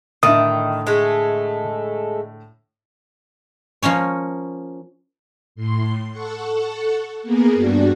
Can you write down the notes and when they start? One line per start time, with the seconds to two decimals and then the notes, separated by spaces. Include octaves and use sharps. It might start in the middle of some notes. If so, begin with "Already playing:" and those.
0.23 A2 D3 D#3 D#5 E5 D#6
0.87 G#3 A3
3.82 F3 A#3 C#4 C#5
5.55 A2 C6
6.11 A4 F#5 C#6
7.23 A#3 B3 G#4 A#4
7.54 G2 G3 D4 F#4